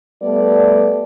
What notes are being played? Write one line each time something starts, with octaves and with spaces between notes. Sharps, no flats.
G3 A3 B3 D5